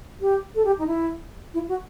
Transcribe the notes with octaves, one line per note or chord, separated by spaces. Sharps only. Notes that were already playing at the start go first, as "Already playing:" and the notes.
G4
A4
G4
D#4
E4
E4
F#4